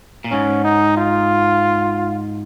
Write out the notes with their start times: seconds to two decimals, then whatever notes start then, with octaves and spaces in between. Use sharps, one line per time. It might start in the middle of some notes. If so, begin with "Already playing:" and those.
0.24 A#2
0.31 G#2 C#4
0.65 D#4
0.97 F4